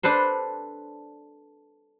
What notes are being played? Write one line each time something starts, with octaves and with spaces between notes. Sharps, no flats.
D4 A4 B4 C5